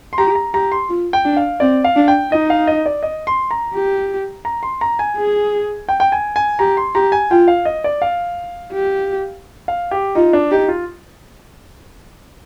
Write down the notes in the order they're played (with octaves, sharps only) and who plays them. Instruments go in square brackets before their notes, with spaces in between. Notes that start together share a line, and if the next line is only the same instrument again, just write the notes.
[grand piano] C6
[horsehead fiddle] G4 [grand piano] A#5
[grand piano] A#5
[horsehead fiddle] G4 [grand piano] A#5
[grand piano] C6
[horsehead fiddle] F4
[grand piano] G5
[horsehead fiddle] D4
[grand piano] F5
[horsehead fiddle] C4 [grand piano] D5
[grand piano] F5
[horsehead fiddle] D4
[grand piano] G5
[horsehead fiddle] D#4 [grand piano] D#5
[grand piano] F5
D#5
D5
D#5
C6
A#5
[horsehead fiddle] G4
[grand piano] A#5
C6
A#5
G#5
[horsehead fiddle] G#4
[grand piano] G5
G5
G#5
G#5
[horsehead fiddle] G4 [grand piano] A#5
[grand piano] C6
[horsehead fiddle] G4 [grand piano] A#5
[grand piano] G#5
[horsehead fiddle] F4 [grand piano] G5
[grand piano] F5
D#5
D5
F5
[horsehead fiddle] G4
[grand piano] F5
G4
[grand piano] D#4 [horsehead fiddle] F4
[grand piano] D4
[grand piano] D#4 [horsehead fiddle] G4
[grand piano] F4